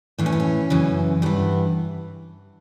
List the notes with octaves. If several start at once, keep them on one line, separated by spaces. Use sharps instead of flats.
A2 E3 D4
C#4
B3
C#4
F#2 C#3 E3
G2 E3 B3